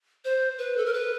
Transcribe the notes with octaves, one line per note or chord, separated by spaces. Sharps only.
C5
B4
A4
A#4
B4